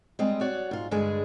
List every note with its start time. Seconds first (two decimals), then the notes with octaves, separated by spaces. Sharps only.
0.19 G3 G#3 C4 D#5
0.41 F#4 C#5 D5
0.71 G#2 F4
0.91 G2 D3 G#3 D4 G#4 G#5